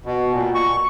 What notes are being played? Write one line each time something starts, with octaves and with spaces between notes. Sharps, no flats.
B2
A#2
C#6